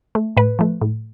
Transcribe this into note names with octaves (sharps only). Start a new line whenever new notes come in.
A3
A2 B4
F3 A3
A2